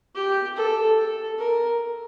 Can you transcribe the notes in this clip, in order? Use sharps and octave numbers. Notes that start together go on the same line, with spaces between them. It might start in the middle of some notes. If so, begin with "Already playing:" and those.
G4
A4
A4
A#4